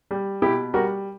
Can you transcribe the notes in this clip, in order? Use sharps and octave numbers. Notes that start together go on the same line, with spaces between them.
G3
B2 E4 G4
G3 F#4 A#4